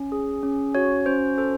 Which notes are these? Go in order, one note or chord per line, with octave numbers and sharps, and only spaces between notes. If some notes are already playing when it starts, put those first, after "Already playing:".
Already playing: C#4
G#4
C#4
F#4 C#5
C#4 C5
A4 C5